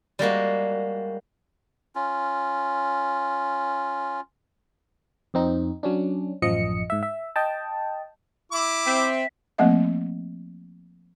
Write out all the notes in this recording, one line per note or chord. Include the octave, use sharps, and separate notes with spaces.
G3 G#3 A#3 F#4
C#4 F4
F2 C4 D#4
F#3 C#4 D4
A1 F#2 F3 D#5 C#7
G#2 E5
E5
D#5 G5 A5
E4 D6
C4 E5
F3 A3 A#3 C4 D#5 E5